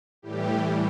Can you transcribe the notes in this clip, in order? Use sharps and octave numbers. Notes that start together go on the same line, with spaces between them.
A2 E3 G3 G4